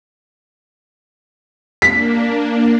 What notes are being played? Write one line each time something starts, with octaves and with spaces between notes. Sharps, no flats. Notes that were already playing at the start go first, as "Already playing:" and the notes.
A#3 D4 B6